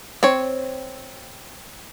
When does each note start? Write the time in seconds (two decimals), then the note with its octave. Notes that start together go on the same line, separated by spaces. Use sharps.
0.23 C4 C#5